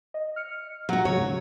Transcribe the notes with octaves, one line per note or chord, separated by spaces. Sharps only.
D#5
F6 C#7
F#3 F#4
G#2 C#3 C#5